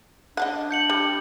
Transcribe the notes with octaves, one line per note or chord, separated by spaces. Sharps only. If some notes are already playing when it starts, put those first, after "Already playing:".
D4 D#5 F5 F#5
G6 C#7 F#7
G3